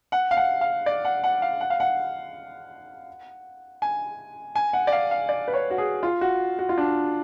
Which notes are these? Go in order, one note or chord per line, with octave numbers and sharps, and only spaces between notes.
F#5
F5
F#5
F5
D5
F#5
F#5
F5
F#5
F5
F#5
G#5
G#5
F#5
D5
F5
F5
D5
B4
C#5
F#4
G#4
F4
F#4
F#4
F4
D4